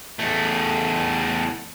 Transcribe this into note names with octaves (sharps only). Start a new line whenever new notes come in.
E2 A3